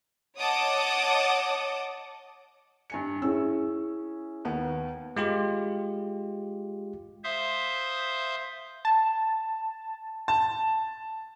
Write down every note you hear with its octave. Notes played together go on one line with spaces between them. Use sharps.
C#5 D#5 F#5 A5 D6 D#6
G2 G#5 C#7
C#4 E4 G#4 E6
D#2 B3
G#3 F4 G4
C5 E5 F5 C6 D#6
A5
A5